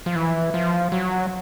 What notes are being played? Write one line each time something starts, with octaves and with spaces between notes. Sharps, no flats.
F3
E3
F3
F#3